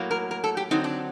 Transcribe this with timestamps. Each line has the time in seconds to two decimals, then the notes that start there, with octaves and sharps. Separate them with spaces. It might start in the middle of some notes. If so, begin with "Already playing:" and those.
Already playing: A2 F#3 A#3
0.11 A#4
0.31 A#4
0.44 A4
0.57 G4
0.71 D3 F#3 C4 D#4
0.84 D4